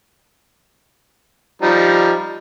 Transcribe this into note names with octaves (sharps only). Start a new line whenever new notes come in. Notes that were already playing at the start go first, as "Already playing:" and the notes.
F3 G3 D#4